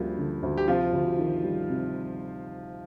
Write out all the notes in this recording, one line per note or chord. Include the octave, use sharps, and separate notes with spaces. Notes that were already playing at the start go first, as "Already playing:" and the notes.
Already playing: D2 F3 G3 A#3
D3
D2
G4
C3 F3 F4
D2
D#3
G3
C3